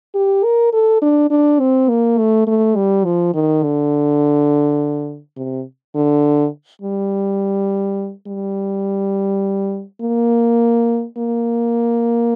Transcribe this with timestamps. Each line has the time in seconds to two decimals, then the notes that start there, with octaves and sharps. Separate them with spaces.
0.15 G4
0.44 A#4
0.73 A4
1.02 D4
1.30 D4
1.60 C4
1.89 A#3
2.18 A3
2.47 A3
2.76 G3
3.05 F3
3.34 D#3
3.63 D3
5.37 C3
5.95 D3
6.82 G3
8.27 G3
10.01 A#3
11.18 A#3